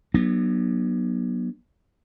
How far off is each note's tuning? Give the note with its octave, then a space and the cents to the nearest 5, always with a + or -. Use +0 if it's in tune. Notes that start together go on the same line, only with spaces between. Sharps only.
F#3 +10 B3 -30 D4 +45